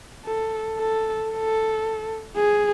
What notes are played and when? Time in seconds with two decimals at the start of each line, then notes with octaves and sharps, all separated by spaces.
0.25 A4
0.78 A4
1.31 A4
2.36 G#4